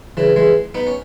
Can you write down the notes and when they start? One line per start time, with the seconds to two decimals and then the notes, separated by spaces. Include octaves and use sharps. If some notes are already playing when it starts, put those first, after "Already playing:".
0.17 C#3 E3
0.36 E3 G#3
0.75 B3 D#4
0.87 C#4